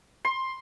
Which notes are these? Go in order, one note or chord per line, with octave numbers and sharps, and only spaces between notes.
C6